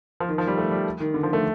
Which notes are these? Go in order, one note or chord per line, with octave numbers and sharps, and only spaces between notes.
F3
D#3
F3
G3
A3
G3
D#3
D3
F3
A3